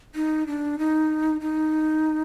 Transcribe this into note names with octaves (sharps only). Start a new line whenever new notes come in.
D#4
D4
D#4
D#4